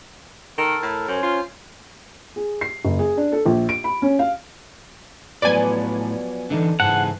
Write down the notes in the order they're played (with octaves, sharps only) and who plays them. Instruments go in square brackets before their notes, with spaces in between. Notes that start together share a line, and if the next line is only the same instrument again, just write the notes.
[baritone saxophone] D#3 [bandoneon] A4 A#4
[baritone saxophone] A2
[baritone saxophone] F#2 [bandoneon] C#4 C5 C#5
[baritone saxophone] F4
[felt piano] G#4
C7
F#1
G#4
D4
A4
A#1
D7
B5
C#4
F5
[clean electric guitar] A2 B4 [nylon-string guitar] F3 F#3 B3 [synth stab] D5 G#5
[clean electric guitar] D3 E3 [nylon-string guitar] D4 D#4 A4
[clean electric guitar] C#2 G#4 A5 [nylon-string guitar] G#2 E3 D#4 [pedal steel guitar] F#5